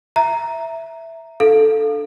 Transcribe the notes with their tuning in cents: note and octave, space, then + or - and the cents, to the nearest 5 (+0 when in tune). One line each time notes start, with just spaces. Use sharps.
E5 +0 A#5 +0
D4 +0 A4 +0 F5 +5